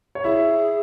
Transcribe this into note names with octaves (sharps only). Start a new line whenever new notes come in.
C#5
E4 G#4 E5